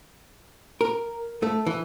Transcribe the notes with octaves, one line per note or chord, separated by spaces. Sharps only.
A#4
A3
E3